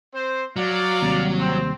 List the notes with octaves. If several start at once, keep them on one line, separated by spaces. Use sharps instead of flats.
C4 C5
F#3 D5 F5
D#2 C3 G3
C4